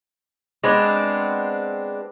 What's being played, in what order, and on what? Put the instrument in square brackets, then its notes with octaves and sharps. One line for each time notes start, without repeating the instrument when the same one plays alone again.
[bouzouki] G#3 B3 C4 D4